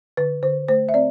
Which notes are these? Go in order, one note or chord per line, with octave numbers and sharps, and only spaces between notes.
D3 B4
D3 C5
A3 C5
E5
C4 D5